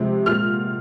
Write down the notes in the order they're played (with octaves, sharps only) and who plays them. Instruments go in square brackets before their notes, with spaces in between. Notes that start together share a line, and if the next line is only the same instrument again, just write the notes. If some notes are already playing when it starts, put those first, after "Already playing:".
Already playing: [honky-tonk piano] C3 F3 G#3
A#2 G#3 F6